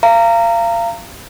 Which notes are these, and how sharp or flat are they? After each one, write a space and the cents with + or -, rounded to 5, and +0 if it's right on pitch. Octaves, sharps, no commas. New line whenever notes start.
F5 -30 A#5 -20